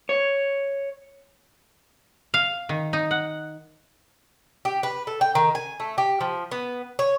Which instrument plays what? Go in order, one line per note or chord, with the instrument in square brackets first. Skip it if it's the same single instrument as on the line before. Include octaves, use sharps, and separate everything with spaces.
[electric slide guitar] C#5
[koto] F5
D#3
D#4
F#5
[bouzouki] G4
B4
A4
G5
D#3
G#5
A3
G4
F3
B3
C#5